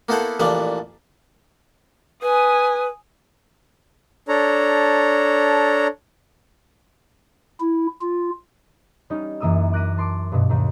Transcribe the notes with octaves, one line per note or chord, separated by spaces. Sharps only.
A#3 B3 E4 A4 C5 F#5
A1 A#2 E3 F3 D4 D5
B4 G#5 D#6
D4 A4 C#5 A#5
E4
F4
G3 C#4 D#4
F#2 E3 A#3 D#6 E6
D6 F#6 A#6 B6 D#7
A5 C6 D6
G2 B2
D#2 D#3